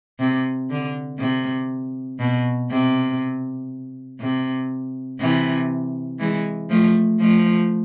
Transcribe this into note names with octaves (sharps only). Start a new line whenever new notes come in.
C3
D3
C3
B2
C3
C3
C3 E3
E3 G#3
F3 A3
F3 A3